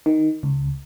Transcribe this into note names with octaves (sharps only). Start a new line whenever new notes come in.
D#3
C#2